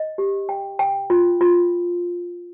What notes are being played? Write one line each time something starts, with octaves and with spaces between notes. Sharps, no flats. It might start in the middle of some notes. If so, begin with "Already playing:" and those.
Already playing: D#5
G4
G5
G5
F4
F4